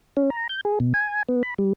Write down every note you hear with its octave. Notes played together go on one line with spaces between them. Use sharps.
C#4
A#5
G6
G#4
B2
G#5
B3
B5
G3